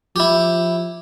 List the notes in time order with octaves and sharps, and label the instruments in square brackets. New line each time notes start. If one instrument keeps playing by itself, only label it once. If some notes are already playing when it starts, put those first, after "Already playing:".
[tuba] F3 [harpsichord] E4 G4